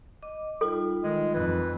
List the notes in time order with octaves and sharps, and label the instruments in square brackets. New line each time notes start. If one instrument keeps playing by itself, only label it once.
[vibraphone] D#5 D6
[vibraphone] G3 D#4 F4 [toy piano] A4
[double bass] D#3 [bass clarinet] G#3
[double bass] F2 [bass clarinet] E3